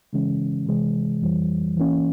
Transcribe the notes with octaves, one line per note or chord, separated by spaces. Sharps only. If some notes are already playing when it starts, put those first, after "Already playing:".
C#3 E3 G#3 C#4
C3 E3 G#3
F2 E3 G3
E3 A#3 C#4